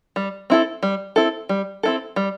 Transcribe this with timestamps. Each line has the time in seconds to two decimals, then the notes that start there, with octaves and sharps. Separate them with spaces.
0.16 G3
0.50 C4 E4 A4
0.83 G3
1.16 C4 E4 A4
1.49 G3
1.83 C4 E4 A4
2.16 G3